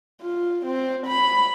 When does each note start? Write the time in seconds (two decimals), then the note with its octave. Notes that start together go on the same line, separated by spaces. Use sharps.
0.21 F4
0.65 C4
1.06 B5